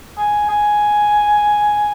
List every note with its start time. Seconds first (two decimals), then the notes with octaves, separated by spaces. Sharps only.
0.18 G#5
0.49 G#5